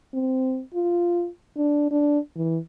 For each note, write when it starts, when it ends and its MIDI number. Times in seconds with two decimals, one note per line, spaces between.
0.14 0.61 60
0.74 1.28 65
1.57 1.90 62
1.91 2.19 62
2.36 2.58 52